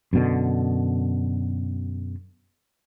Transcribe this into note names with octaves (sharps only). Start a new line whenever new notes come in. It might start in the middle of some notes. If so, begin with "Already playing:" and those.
F#2 B2 D3